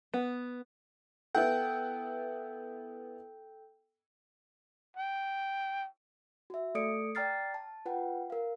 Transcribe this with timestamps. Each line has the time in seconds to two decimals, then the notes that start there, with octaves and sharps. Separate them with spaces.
0.14 B3
1.35 B3 E4 A4 F#5 G5 G6
4.97 G5
6.50 F#4 E5
6.75 A3 A4 D5 D#6 C#7 D7
7.15 D5 G5 A#5 F6 A6 C7
7.54 A5
7.86 F4 B4 F#5 G5
8.30 A#4 F5